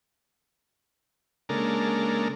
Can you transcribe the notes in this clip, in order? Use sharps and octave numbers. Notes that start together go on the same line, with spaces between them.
C#3 G#3 A#3 D4 A4 A#4